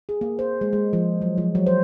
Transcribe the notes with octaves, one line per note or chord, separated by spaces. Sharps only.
G#4
A#3
C5
G#3
G#3
F3
F#3
F3
F#3
C5